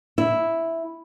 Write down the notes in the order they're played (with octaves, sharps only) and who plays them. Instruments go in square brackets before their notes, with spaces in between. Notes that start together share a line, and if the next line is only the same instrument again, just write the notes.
[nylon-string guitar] E4